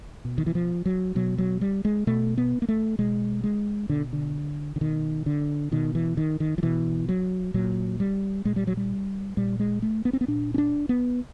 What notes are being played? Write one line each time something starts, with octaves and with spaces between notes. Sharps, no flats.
B2
D#3
E3
F3
F#3
B2 F#3
F#3
G3
G#3
B2 A3
B3
A#3
A3
B2 G#3
G#3
B2 D3
D3
D3
B2 D#3
D3
B2 D#3
E3
D#3
D#3
F3
B2 E3
F#3
A#2 F#3
G3
A#2 G#3
G3
F#3
G3
A#2 G3
G#3
A3
B3
C4
B3
A#2 D4
C#4
D4
B3